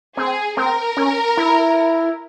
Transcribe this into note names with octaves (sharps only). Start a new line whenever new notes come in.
C4 G#4
C4 A#4
C#4
E4